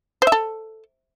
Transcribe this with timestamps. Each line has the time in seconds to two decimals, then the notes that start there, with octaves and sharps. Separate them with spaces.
0.22 C5
0.27 E5
0.32 A4